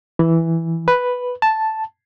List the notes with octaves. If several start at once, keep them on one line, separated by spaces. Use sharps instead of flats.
E3
B4
A5